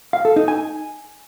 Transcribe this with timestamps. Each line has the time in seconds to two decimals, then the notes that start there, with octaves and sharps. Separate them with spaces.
0.13 F5
0.25 A4
0.36 D#4
0.48 G#5